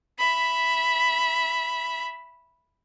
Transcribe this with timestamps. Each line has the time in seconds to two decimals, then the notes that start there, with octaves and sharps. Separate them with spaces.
0.18 E5 B5